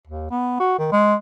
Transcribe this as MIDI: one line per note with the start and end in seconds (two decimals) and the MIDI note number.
0.07 0.30 39
0.31 0.57 59
0.60 0.76 66
0.79 0.90 51
0.92 1.15 56